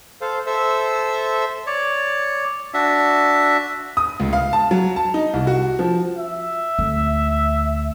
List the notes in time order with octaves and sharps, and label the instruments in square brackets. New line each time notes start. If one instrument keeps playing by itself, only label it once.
[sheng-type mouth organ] A4 C5 F5
A4 C5 E5 E6
[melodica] C#5 D5
D4 F#4 E5
[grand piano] D#6
C#2
F5
A5
F#3
A5
D#4
C2
F#4
F3
[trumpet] E5
[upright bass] D2